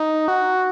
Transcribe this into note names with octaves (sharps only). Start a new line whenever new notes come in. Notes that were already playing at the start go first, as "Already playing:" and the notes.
Already playing: D#4
F#4